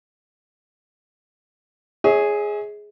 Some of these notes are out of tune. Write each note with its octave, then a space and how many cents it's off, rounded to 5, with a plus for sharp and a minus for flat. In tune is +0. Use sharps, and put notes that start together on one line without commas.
G#4 +0 C#5 +0 E5 -45